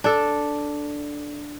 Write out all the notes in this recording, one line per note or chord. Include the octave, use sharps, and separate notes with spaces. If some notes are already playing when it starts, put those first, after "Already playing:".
D4 A4